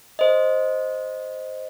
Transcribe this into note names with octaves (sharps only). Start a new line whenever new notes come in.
C5 D#5